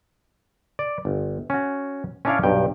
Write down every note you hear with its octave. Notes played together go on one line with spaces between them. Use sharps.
D5
G1
C#4 F#4
C#4 D4 E4 C#5 D5 F5
B1 G2 G5